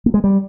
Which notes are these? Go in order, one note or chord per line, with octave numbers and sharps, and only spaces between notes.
A#3
G#3
G3